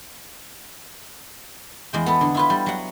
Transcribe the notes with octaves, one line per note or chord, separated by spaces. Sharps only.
E2 G#3 G5
B3 A4
D3
E4 F4 B4
G3
F#3 F#5